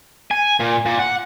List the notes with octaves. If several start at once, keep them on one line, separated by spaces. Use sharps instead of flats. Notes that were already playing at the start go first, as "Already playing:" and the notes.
G#5
A#2
A#2
F#5